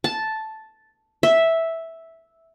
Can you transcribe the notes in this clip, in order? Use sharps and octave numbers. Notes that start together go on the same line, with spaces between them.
A5
E5